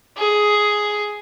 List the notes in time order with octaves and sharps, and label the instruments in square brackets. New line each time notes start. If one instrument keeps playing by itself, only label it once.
[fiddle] G#4